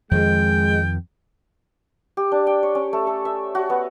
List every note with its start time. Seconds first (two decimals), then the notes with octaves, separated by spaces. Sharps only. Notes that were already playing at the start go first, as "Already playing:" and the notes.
0.11 F2 D#3 F3 G#3 G5
2.17 G4
2.32 D4
2.47 G5
2.63 C#5
2.75 C#4
2.93 A3
3.07 A4
3.25 E5
3.55 F#4
3.70 B3